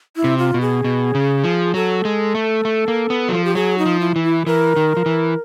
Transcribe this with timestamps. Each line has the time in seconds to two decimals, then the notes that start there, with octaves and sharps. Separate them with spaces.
0.16 E4
0.24 C3
0.38 F4
0.54 B2
0.61 G#4
0.84 B2
1.15 C#3
1.44 F3
1.74 F#3 A4
2.05 G#3
2.35 A3
2.65 A3
2.88 A#3
3.10 B3
3.29 F#3
3.33 F3
3.44 G4
3.55 F#3 G#4
3.78 D#4
3.86 F3
4.00 E4
4.16 E3
4.23 E4
4.46 E3 A#4
4.76 D#3
4.97 F3
5.06 E3